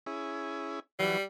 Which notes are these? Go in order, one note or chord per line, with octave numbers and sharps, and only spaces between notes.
C#4 E4 G#4
E3 F#3 G3 B4